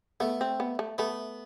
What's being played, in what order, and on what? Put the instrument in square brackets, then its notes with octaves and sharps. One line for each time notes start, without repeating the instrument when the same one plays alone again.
[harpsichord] A3 [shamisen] B3
[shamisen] C4
B3
A3
[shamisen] A3 [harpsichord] B3